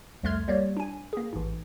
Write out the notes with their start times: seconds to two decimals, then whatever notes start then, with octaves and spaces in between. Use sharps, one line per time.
0.23 C2 F2 A3 C6 F6 G#6
0.48 G3 A#3 C#5 D5
0.77 D4 G#5
1.13 A#3 G#4
1.33 A1 G#2